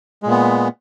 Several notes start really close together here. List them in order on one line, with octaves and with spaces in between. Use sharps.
G#3 A#2 B3